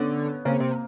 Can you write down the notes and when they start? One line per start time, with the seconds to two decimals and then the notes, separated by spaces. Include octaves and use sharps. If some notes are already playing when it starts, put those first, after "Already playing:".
Already playing: D3 B3 C#4
0.45 C#3 A#3 C4
0.60 C3